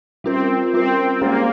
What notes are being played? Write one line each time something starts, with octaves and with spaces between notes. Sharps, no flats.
G3 C4 C#4 F4 A#4
G3 C4 C#4 F4 A#4
G#3 A#3 C#4 G#4 C5